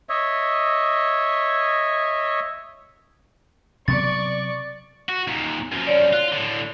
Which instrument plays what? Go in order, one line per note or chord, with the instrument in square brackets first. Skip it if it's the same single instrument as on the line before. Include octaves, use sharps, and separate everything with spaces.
[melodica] C#5 D#5 E5
[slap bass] C3 F#3 B3 [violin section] D5 C#6 [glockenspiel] A6
[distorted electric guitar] F#4
D#2 A#2
F#2 F3
[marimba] C#5 D5
[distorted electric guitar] F4 [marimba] F#6
[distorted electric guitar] A2 D3